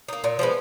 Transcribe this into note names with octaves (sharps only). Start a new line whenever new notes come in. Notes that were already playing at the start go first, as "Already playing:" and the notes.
A#3 D#4
A#2
F3 G#3 B3